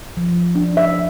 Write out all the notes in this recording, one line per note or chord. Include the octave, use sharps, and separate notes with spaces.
F3
D4
E5